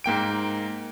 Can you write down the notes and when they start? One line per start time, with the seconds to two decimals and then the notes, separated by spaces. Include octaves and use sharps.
0.04 G#2 A#3 G5 D7